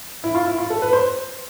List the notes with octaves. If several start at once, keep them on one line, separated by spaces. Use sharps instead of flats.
E4
F4
E4
F4
A4
B4
C5